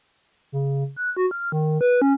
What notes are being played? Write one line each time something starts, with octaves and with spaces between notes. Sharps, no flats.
C#3
F#6
F#4
F6
D#3
B4
C#4